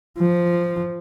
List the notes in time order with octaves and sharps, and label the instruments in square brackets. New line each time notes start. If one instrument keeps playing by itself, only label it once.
[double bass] F3